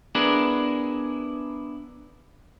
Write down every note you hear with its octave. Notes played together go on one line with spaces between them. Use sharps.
B3 D4 E4 G#4 A#4